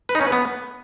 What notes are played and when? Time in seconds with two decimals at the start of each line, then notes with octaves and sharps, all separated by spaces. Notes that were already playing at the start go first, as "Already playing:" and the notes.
0.09 B4
0.15 D#4
0.21 C#4
0.27 B4
0.32 B3